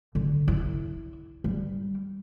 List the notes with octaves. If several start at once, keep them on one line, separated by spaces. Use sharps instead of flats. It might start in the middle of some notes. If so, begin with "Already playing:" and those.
D3
E4
G3